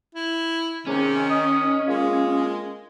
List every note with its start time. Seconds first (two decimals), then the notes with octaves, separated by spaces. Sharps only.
0.15 E4
0.87 G#2 C3 D#3 C#4
1.30 D#5 D#6
1.88 G#3 A#3 F4 G#4